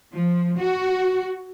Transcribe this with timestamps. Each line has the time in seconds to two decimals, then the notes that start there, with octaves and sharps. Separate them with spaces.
0.13 F3
0.58 F#4